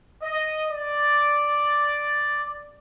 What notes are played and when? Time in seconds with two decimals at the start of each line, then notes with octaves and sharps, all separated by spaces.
0.22 D#5
0.69 D5